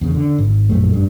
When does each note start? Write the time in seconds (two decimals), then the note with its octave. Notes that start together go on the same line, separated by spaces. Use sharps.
0.01 E2 C#3
0.14 D3
0.39 G#1
0.69 A#1 F#2 A3
0.94 G2